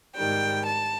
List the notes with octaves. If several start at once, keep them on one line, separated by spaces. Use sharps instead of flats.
G#2 D#3 G3 G5
A5